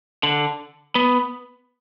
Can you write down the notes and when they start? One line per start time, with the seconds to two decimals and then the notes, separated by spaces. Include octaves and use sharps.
0.23 D3
0.95 B3